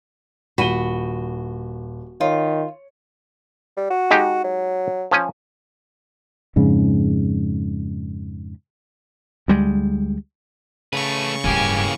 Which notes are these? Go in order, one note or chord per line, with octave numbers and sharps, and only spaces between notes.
D#1 F#4 B5 D#7 G7
D#3 F4 C#5
G3
F#4
G#3 D#4 G4
F#3
F3 C#4 G#5
F2 G#2 C#3
D2 G3 G#3
C#3 A3 B4 C#6
D1 G2 E3 A#3 G4 G#5